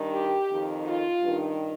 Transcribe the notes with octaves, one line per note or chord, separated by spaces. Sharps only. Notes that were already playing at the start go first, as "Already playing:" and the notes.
Already playing: G2 D#3
G4
F2 D#3
F4
G2 D#3